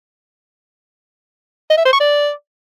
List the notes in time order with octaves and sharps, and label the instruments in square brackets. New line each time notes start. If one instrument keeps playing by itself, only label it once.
[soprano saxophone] D#5
E5
C5
C#6
D5